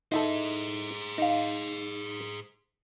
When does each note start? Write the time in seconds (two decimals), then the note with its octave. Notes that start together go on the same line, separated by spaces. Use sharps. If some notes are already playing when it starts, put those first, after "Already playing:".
0.12 D#4 E4 G#4 A4 C5
1.18 D#4 F5